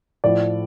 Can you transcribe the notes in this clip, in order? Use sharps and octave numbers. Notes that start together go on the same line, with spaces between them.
A2 F3 D5